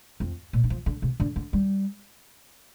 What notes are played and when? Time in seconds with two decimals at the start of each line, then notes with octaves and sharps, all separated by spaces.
0.20 F2
0.53 A#2
0.64 D#3
0.70 F3
0.86 D3
1.02 C3
1.20 D3
1.36 D3
1.53 G3